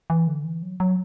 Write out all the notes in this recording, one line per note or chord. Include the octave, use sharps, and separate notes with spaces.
E3
D3
E3
F#3
F#3